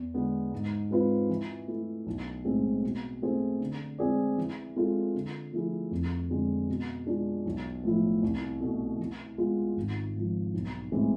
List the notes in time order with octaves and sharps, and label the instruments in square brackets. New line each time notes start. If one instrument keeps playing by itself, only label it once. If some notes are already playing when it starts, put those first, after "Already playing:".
Already playing: [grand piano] E2
D3 G#3 B3
G#2
G#3 C4 F4 B4
E3
A3 E4
B1
A2 G#3 C4 G#4
B2
A3 C4 G#4 C5
D3
G#3 C4 G#4 D5
E3
G#3 C4 F4 A4
D3
F3 A3 E4 G#4
F2
D3 G#3 C4
B2
G#3 D4 F4
B1
A2 F3 A3 E4
C2
B2 A3
E3
G#3 B3 F4
G#1
G#2 F3
B1
A2 E3 G#3 C4